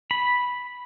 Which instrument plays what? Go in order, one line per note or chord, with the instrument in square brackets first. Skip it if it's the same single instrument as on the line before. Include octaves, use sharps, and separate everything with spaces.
[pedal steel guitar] B5